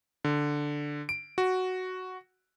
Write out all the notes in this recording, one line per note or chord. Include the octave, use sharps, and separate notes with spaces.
D3
D7
F#4